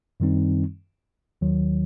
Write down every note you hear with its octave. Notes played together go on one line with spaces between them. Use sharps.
F#2 D#3 G3 C4 D#4
D#2 D#3 F#3